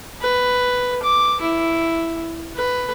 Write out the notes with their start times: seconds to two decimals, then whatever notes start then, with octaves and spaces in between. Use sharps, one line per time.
0.21 B4
1.02 D6
1.41 E4
2.56 B4